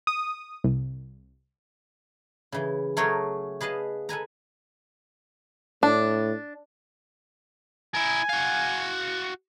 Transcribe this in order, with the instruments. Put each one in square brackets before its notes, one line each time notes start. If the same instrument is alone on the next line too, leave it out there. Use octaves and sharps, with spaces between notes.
[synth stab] D#6
C2
[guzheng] C#3 E3
F#3 A3 C#4 G#4 A#4 C#5
G#4 B4 D#5 F5 A5
A4 B4 G#5 A#5
[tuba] A2 [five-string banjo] D4
[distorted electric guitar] E4 A#4 [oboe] G#5
[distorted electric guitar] F#4 F5